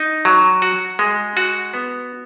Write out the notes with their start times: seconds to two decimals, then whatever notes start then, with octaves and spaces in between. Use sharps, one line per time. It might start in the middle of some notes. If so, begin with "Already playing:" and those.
Already playing: D#4
0.25 F#3
0.62 F#4
0.99 G#3
1.37 F#4
1.74 B3